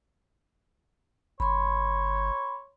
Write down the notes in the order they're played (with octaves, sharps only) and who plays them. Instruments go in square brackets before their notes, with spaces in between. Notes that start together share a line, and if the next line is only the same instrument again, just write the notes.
[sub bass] G1 [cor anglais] C#5 [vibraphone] B5 C6